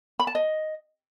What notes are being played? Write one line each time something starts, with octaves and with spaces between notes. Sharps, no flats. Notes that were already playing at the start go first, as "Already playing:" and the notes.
B5
A5
D#5